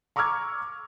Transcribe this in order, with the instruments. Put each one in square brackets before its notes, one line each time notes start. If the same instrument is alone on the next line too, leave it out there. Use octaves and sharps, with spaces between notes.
[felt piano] A#5 C#6 D6 E6 F6 G#6